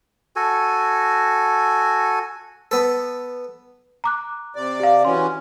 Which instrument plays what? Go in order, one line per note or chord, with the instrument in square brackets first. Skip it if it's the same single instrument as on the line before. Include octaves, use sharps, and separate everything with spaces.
[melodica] F#4 A4 G#5
[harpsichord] B3 A4
[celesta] A#5 D6 F#6
[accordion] C3 D5
[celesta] G4 F5
[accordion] E3 F#3 C#4 [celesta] C6